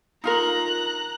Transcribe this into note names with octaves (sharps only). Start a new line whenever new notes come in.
D#4 F4 A#4 A#5 F#6